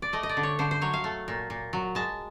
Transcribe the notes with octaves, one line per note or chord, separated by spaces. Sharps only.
D5
A3 D#5
D#5
D5
D3
C#5
D3 C5
C5
F#3 C#5
F5
A3
A#2
A#2
F#3
G#3 A5